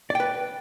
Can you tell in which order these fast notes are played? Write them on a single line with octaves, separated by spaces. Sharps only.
D5 G5 B4